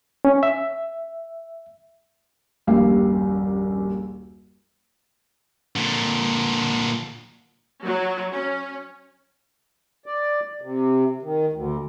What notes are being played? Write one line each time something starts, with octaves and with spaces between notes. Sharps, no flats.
C#4
E5
D#1 A#1 F#2 G4 F5
A#2 D3
F#3
C#4
D5
C3
D#3
D2